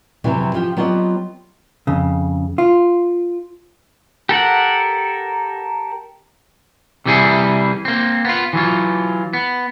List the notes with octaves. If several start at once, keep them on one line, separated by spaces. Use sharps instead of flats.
F2 C3 E3 F#3
F3 F4 G4
F#3 B3 C4 F4 G4 D#5
F2 C#3
F4
G4 A4 A#4 F#5
C3 E3 G3 E4 G#4
A#3 C4
B3 F4
E3 F#3 F4
B3